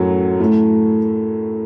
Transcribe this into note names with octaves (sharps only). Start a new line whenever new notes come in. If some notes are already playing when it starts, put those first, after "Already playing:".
Already playing: F#2 A2 F#3 A3
A2 A3